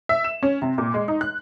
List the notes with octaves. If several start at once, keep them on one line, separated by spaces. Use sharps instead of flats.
E5
E7
C#4
C3
A#2
G#3
D#4
F#6